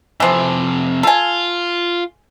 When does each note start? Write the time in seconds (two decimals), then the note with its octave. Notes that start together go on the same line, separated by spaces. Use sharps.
0.20 F2 C3 E3 F3
1.03 F4 A4 G#5